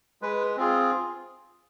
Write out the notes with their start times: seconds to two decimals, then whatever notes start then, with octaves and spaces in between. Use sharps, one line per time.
0.22 G#3 B4
0.57 C4 F4 G#4